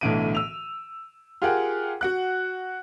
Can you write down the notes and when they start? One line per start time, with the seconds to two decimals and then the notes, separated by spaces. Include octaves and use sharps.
0.01 B1 A2 D3 E3 D7 D#7
0.35 E6 F7
1.42 F4 G4 G#4 A#4 F#5 G5
2.01 F#4 F#5 F#6